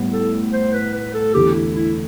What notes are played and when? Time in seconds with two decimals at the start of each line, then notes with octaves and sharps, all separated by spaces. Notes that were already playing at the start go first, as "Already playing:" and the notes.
Already playing: A2 G3 B3
0.12 A4
0.53 C5
0.73 B4
0.94 B4
1.14 A4
1.34 E2 D3 A3 G4
1.54 E4
1.75 E4